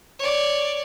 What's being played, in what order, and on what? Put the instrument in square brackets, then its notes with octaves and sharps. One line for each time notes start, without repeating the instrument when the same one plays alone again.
[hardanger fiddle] C#5 D5